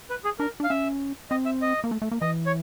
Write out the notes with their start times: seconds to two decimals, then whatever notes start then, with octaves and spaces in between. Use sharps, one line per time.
0.10 B4
0.25 G#4
0.39 D4 A#4
0.60 D4
0.64 F5
0.70 C#4 E5
1.30 C4 D#5
1.45 E5
1.62 D#5
1.84 A#3
1.91 A3
2.02 A3
2.11 A#3
2.21 E3 D#5
2.46 C#5